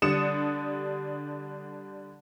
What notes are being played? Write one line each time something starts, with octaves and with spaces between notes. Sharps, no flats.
D3 G3 D4 D#6 C#7 E7